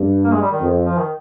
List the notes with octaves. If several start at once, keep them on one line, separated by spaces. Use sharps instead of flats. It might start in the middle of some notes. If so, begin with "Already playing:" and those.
Already playing: G2
A#3
G#3
G3
D#3
F2
F3
D#3